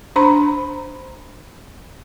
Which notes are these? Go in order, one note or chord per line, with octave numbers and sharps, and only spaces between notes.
D4 C5 A#5 B5